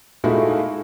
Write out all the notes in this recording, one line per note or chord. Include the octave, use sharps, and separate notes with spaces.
A#2 G#3 A3 D#4 E4 F#4